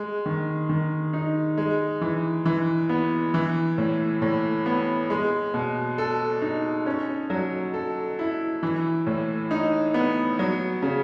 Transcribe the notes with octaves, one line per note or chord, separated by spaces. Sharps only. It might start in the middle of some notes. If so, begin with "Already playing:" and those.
Already playing: G#3
D#3
D#3
D#4
G#3
E3
E3
B3
E3
A2
A2
B3
G#3
B2
A4
D#4
C#4
F#3
A4
E4
E3
A2
D#4
B3
F#3
C#3